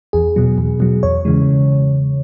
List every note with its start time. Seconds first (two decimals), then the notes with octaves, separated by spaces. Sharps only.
0.13 E2 G#4
0.36 B2 F#3
0.58 E2
0.80 B2 F#3
1.03 E2 C#5
1.25 C#3 E3 G#3